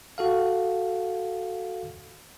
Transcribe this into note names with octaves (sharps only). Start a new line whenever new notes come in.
F#4 A4 F5